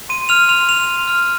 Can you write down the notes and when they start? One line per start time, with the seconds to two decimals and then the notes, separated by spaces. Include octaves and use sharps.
0.09 C6 D#7
0.29 F6 F7
0.49 C6 F7
0.68 C6 F7
0.88 C6
1.08 F6